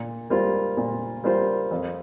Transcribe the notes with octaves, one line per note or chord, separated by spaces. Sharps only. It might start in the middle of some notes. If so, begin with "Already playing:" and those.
Already playing: A#2
G3 A#3 F4 C5
A#2
G3 A#3 F4 C5
F2